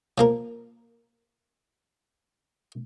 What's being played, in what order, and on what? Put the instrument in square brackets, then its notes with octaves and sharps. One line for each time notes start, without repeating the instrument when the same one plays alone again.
[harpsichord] F3 A#3 A#4